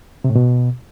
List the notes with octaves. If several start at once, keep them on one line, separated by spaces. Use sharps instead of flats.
C3
A2
B2